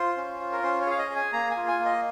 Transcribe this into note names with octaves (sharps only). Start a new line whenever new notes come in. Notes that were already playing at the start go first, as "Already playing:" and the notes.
Already playing: F4 C5
C#4
F4
A#4
C#4 C5
C#5
G#4 F5
D#5
G#4
G#5
A#3 A#5
G#5
F4
G#5
A#3
D#5